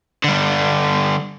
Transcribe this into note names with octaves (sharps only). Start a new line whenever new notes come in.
D3 G3